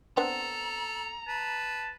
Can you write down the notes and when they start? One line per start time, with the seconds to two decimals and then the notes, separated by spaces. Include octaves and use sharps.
0.17 B3 C4 D4 A4 A#5
1.28 B4 A5